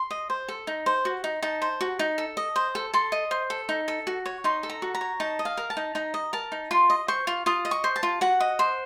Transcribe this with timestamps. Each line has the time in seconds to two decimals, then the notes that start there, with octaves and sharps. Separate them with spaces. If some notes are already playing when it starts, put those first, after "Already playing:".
Already playing: C6
0.11 D#5
0.30 C5
0.48 A4
0.67 D#4
0.86 C5
1.05 F#4
1.24 D#4
1.42 D#4 A5
1.62 C5
1.81 F#4
1.99 D#4
2.18 A4
2.37 D#5
2.56 C5
2.75 A4
2.94 A4 C6
3.12 D#5
3.31 C5
3.50 A4
3.69 D#4
3.88 A4
4.07 F#4
4.26 C#5
4.44 D#4 C6
4.63 A4
4.69 A#5
4.82 F#4
4.95 A#5
5.01 C#5
5.20 D#4 A5
5.39 D#5
5.45 F5
5.57 A#4
5.70 A5
5.77 D#4
5.95 D#4 A#5
6.14 D#5
6.33 A#4 A5
6.52 D#4
6.71 F4 C6
6.90 D#5
7.08 C5 C#6
7.27 F4
7.46 F4 D#6
7.65 D#5
7.71 C#6
7.84 C5
7.96 A5
8.03 F4
8.21 F#4 F#5
8.40 D#5
8.59 C5